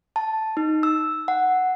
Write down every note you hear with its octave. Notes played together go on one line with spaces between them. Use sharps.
A5
D#4
E6
F#5